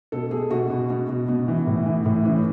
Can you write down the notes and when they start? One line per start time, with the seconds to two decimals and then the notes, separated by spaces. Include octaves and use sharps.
0.12 B2 A4
0.31 B2 G#4
0.51 B2 F#4
0.70 B2
0.90 B2
1.09 B2
1.28 B2
1.48 E3
1.67 A2
1.86 E3
2.06 A2
2.25 E3 C#4